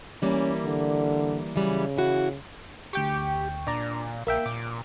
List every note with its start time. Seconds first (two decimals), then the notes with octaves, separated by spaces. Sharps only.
0.22 E3 G3 A#3 C#4
0.63 D3
1.56 C#3 E3 F#3 G3
1.96 E3 E4 F#4
2.93 D2 G4 G5 C#6
3.67 A#2 D4 D5 A#5
4.27 A#1 A#3 E5 G5
4.46 A#2 D6